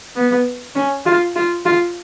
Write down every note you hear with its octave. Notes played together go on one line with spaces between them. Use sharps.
B3
C#4
F4
F4
F4